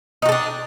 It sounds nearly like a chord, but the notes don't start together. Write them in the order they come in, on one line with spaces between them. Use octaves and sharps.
D#4 F#4 A4 D4